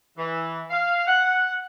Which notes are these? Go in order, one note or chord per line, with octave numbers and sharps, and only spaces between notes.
E3
F5
F#5